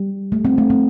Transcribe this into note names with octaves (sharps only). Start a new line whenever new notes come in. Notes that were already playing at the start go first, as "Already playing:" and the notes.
Already playing: G3
A3
C4
A3
C4